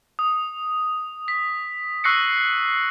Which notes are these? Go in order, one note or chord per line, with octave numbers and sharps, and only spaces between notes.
D#6
B6
C#6 E6 F#6 A#6 C7 C#7